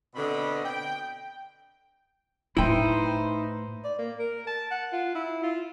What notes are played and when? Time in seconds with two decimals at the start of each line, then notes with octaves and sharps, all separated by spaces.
0.15 B2 D3 B3 C4 D#5 B5
0.65 G5
2.57 A2 A3 D#4 E4 B4 C5 E5 G5
3.84 D5
3.99 A#3
4.19 A#4
4.47 A5
4.71 F#5
4.92 F4
5.15 E4
5.43 F4